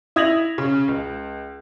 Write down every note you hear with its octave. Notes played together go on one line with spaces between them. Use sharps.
E4 D#6 G#6 A#6 F7 F#7
C#3
C#2